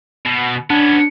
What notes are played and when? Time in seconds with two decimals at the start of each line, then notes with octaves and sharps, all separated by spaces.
0.25 B2
0.70 B3 C#4 D4